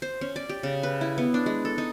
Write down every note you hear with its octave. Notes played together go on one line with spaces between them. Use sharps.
C5
C#4
D5
G4
C#3
B4
E4
B3
D4
G#3
A4
D#4